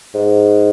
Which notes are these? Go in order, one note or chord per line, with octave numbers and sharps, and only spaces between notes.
G#2